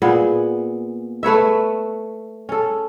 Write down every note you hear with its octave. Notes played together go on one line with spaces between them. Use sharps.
A#2 B3 G#4
A3 B4 C#5 E5
C#4 A4